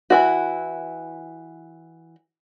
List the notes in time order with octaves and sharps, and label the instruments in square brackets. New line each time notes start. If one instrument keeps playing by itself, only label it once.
[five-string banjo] E3 E4 F#4